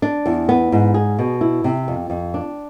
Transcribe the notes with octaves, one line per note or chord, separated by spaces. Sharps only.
D4
E2
B3
G#2
G#4
B2
E4
C3
F2
F2
D4